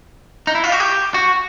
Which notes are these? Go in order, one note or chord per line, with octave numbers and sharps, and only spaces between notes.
D#4
E4
F4
F#4
G4
F#4